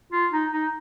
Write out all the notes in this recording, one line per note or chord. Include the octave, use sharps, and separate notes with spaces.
F4
D#4
D#4